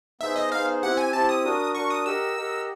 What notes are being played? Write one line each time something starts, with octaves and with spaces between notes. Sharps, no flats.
B3 D#4 G#4 C5 E5
D#5
B3 D#4 G#4 C5 F5
C4 E4 G4 F#5
G#5
C4 E4 G4 A5
D#6
D4 F#4 A#4
D4 F#4 A#4 C#6
D#6
G4 A#4 D#5 F#5 E6
G4 A#4 D#5 F#5